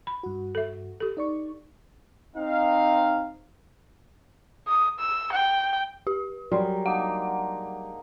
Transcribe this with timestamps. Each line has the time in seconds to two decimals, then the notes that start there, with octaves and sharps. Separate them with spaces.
0.07 B5
0.23 G2 F#4
0.55 A4 E5
1.00 G4 A4
1.17 D#4 D5 C#6
2.36 C4 D#4 F5
4.68 D#6
4.99 E6
5.33 G5
6.07 G4
6.51 F#3 G3 G#4 A#4 C6
6.86 A#3 D4 D#4 F#5